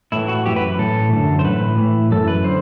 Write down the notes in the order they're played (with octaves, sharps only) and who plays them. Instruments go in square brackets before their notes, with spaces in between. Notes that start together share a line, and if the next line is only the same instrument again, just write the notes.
[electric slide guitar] A2 E3 E4
F#4
F#2 E3 G4
B4
B4
A2 E3 A4
F#2 D3
C5
A2 E3 B4
A2 E3
F#2 E3 A4
B4
D3 C5